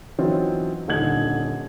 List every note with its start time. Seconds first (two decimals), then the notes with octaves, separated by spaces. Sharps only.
0.19 E3 F#3 C4 C#4 D#4 F4
0.88 D#1 D3 D#4 G#6 F#7